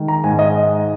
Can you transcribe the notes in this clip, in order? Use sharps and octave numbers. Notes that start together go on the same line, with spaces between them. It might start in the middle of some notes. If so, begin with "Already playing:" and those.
Already playing: D#3 G#3
A#5
G#2 G#5
D#5